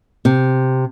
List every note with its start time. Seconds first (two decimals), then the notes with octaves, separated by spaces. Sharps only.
0.25 C3